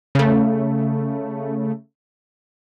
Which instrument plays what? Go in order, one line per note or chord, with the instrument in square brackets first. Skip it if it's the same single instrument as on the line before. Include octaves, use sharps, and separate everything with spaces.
[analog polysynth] C#3 A3